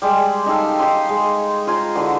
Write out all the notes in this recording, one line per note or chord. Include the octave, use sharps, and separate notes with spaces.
G3 G#3
D#4 G4 A4 F5
D#4 G4 G#5 C6
G#3
F4 C5 G#5 A#5
D3 E3 F#4